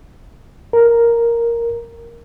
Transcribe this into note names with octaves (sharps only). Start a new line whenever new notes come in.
A#4